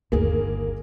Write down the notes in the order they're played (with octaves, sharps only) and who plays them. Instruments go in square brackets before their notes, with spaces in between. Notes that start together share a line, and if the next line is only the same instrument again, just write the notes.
[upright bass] G1 D#2 [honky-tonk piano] A#3 G#4